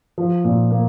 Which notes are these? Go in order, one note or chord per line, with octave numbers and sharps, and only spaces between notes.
F3
A#2
A#3